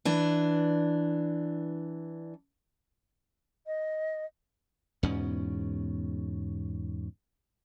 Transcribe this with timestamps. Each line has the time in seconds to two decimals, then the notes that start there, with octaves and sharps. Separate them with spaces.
0.05 E3 D4
3.66 D#5
5.03 E2 G#2 B2 C#4